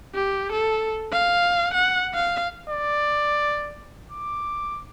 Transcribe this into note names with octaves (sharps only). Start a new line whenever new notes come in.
G4
A4
F5
F#5
F5
D5
D6